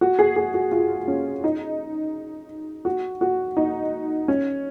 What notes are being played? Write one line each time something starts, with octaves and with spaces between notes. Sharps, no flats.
F#4
G#4
G#4
F#4
F4
C#4
D#4
F#4
F#4
D#4
C#4